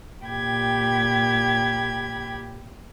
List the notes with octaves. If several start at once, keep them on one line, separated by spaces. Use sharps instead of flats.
A#2 G4 G5 B5 G#6